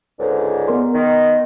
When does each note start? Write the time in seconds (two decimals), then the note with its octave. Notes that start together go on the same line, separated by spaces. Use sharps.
0.19 C#2 G#2 D3
0.68 B3 A#4 C6
0.94 D#3